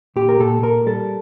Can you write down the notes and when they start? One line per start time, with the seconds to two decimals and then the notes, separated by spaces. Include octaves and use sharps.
0.16 A#2 G4
0.29 A#4
0.40 A#2 A4
0.62 A#2 A#4
0.86 G3 A4